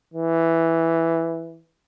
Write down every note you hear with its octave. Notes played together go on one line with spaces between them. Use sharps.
E3